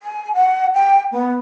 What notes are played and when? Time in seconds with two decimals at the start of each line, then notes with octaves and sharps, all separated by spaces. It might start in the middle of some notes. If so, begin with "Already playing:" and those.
0.03 G#5
0.34 F#5
0.74 G5
1.12 B3